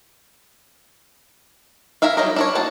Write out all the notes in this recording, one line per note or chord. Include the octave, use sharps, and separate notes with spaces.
E4 A#4 E5 F5
F#3 G3 D#4 A#4
D4 E4 C#5
A#3 F#4 F#5 A5